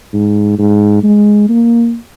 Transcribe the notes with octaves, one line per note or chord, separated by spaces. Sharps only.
G#2
G#2
G#3
A#3